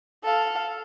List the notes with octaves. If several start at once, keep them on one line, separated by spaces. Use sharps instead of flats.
A4 F5